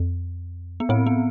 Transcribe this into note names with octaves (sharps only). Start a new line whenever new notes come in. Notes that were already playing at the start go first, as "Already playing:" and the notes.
Already playing: F2
B3
A2 C4
B3